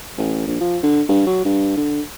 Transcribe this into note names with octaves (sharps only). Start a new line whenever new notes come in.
A1
A#1
F3
D3
G2
F#3
G2
D3